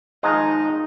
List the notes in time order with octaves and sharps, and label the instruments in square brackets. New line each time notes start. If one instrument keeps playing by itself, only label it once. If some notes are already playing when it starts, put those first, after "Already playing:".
[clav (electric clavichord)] D#3 F3 G#3 [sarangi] D#4